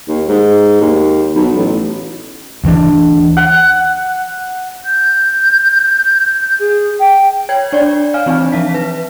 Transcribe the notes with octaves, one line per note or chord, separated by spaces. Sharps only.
D#2
G#2
D#2
B1
A1
D2 E3 A#3 D4
F#5
G6
G#4
G5
C#5 G5 G#6
D4 C#5 D5
F5 G#5 F6
E3 C4 D4 D#4
F3 E5 A5 B6
B4